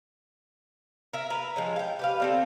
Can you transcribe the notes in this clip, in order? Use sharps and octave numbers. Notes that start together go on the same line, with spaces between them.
A#4 E5
B4 A#5
F3 G#3 C#4
F5 G5
G4 B4 F5
D3 C4 A4